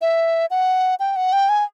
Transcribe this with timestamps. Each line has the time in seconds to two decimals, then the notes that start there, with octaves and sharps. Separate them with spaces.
0.01 E5
0.51 F#5
1.00 G5
1.16 F#5
1.33 G5
1.49 G#5